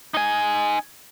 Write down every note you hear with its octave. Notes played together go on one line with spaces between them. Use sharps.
D#4 G#5